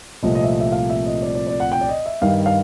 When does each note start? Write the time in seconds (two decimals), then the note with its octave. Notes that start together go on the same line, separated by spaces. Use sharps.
0.23 C2 A#2 F3 A3 C4 D#5
0.35 D#5
0.44 E5
0.47 D#5
0.60 E5
0.72 F5
0.90 E5
1.06 D#5
1.22 D5
1.35 D5
1.47 D5
1.60 F#5
1.72 G5
1.81 D5
1.89 D#5
2.06 E5
2.21 G2 D#3 G3 F5
2.46 F5